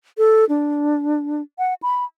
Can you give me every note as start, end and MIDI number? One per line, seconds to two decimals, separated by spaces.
0.18 0.45 69
0.49 1.42 62
1.59 1.74 78
1.83 2.05 83